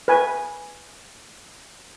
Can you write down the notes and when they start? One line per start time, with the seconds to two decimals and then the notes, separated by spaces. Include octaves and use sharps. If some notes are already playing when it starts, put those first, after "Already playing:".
0.08 B4 G#5